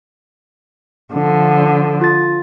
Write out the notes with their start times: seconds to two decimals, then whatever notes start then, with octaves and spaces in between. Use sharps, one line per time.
1.13 D3 F3
2.01 F4 A6